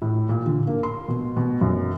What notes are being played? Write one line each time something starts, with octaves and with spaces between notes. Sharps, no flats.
A2
A#2
D3
A#3
C6
B2
B2
F#2